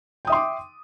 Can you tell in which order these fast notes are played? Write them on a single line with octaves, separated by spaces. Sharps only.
G5 D#6 E5 C6 D6